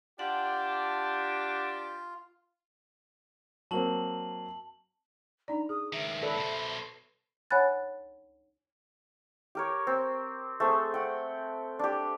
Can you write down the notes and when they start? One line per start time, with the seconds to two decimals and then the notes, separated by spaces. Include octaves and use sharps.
0.19 D4 F4 G4 F#5
3.71 F#3 A#3 C4 A5 F#7
5.48 D4 D#4 D5 A#5
5.69 G#4 D#6
5.93 C#2 D#3 E5
6.23 A4 B4 D5
6.37 B2 C5
7.51 C#5 F#5 G#5 B5 F#6 A6
9.55 G4 A#4 C#5
9.87 C4
10.60 A3 C4 G#4
10.94 F#5 G5
11.79 D4 G4